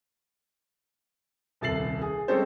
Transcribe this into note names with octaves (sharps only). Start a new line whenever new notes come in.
D#1 C2 A4 A6 C7 F#7
G#4
G3 G#3 C4 C#4 A4 C5